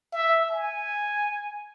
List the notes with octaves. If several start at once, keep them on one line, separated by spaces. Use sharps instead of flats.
E5
G#5